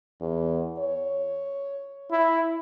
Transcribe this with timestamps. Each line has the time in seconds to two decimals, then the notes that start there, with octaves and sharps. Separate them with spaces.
0.21 E2
0.79 C#5
2.11 E4